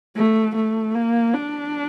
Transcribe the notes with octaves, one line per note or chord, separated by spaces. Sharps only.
A3
A3
A#3
D4